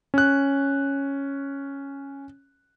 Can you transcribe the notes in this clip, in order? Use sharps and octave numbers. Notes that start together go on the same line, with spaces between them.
C#4 F#6